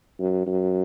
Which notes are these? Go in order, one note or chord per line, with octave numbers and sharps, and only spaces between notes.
F#2
F#2